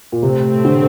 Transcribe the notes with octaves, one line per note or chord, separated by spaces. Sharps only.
A#2
A2 C3 A3 C4
D3